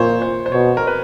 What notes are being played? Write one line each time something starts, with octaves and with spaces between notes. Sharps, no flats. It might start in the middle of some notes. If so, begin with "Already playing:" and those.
Already playing: A#2 C5 C#5
C5
C5
B2 C#5
A#4
B4